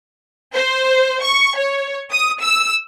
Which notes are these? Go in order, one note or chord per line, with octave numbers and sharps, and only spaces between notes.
C5
C#6
C#5
D#6
E6